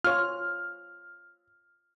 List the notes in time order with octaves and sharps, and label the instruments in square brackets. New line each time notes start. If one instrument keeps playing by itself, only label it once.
[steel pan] F4 C#5 [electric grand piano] F6